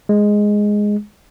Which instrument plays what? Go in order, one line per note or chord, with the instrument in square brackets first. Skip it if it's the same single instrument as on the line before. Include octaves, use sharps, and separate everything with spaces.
[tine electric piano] G#3